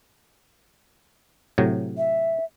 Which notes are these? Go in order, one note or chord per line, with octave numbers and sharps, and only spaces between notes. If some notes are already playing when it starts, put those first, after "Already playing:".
A2 C3 F#3
E5